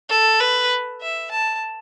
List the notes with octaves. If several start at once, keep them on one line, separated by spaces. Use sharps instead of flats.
A4
B4
E5
A5